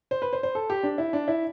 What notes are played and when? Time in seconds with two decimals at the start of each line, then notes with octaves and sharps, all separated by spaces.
0.11 C5
0.22 B4
0.33 C5
0.43 C5
0.55 A4
0.70 G4
0.83 D4
0.98 E4
1.13 D4
1.28 E4